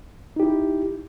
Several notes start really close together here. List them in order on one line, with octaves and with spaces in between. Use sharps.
D#4 G4 E4